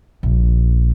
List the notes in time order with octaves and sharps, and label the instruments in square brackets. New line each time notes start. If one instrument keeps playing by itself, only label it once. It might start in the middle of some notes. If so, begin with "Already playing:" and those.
[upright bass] A#1